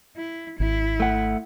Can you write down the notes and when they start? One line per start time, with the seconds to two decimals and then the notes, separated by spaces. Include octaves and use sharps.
0.17 E4
0.60 G#1 E4
1.00 A3 F#5